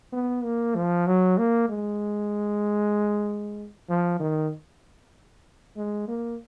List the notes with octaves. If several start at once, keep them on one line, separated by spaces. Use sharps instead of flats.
B3
A#3
F3
F#3
A#3
G#3
F3
D#3
G#3
A#3